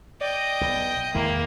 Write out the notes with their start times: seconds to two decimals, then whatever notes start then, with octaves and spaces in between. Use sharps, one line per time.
0.21 D5 D#5 G5
0.61 B1
1.15 E2 D#3 G#3 A#3 E4